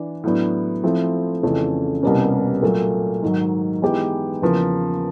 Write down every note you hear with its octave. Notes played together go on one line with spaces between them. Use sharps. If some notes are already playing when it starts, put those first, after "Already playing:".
Already playing: E3 D4
A2 F#3 B3 D4
F3 A3 C4 E4
F2 C#3 E3 A3 C#4
C2 B2 G3 A#3 C#4
A#2 F#3 A3
G#2 D#3 F#3
E3 G#3 B3 D#4 G4
E2 C#3 F3 A#3